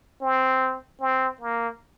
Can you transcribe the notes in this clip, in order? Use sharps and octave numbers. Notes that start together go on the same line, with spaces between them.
C4
C4
A#3